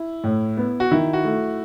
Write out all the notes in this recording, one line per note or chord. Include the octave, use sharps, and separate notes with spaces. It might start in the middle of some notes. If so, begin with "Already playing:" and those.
Already playing: E4
A2
B3
F#4
D#3 E4
F#4
A3